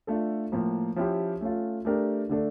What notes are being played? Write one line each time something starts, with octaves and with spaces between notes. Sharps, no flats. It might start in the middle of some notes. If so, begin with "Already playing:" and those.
A3 D4 F4 A4
A2 F3 A#3
F3 C#4 E4 G4
A3 C#4 F4
A3 D4 G4 A#4
D3 A3 D4 A4